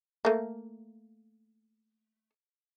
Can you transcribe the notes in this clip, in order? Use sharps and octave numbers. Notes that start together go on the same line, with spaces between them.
A3 A#3